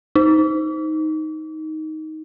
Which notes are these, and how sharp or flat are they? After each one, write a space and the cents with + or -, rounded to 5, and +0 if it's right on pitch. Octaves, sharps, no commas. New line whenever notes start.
D#4 +10